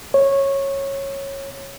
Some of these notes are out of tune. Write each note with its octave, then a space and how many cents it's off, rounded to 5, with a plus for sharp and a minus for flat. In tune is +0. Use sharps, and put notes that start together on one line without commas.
C#5 -15